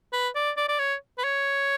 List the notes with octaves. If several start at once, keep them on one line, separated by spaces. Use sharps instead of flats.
B4
D5
D5
D5
C#5
B4
C#5